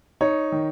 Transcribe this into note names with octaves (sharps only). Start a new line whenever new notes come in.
D#4 C#5
D#3